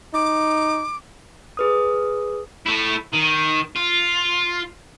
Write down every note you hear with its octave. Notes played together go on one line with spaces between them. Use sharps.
D#4 D6
G#4 B4 D#6
A3 E4
D#3
F4